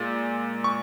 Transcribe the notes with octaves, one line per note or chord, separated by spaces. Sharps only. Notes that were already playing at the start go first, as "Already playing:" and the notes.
Already playing: A#2 G#3
C#6